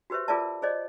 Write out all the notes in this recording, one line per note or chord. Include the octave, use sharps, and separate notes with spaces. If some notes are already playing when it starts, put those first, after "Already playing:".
F#4 G4 B4 C5 E5
F4 G#4 A#4 D5 E5 A5
G#4 C5 D5 D#5